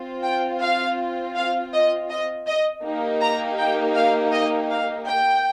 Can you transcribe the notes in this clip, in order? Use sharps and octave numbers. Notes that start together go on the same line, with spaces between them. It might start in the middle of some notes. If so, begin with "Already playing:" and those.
Already playing: C4 F4
G5
F5
F5
D#5
D#5
D#5
A#3 D#4 G4
A#5
G5
F5
D#5
F5
G5